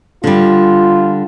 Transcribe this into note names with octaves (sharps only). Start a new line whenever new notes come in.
D3 G3 F4